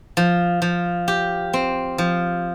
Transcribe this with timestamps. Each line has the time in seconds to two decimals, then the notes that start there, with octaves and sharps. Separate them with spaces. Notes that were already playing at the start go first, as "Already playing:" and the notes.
0.17 F3
0.62 F3
1.08 G4
1.53 C4
1.98 F3